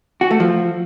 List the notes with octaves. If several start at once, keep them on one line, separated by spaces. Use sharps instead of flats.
F#4
A3
F3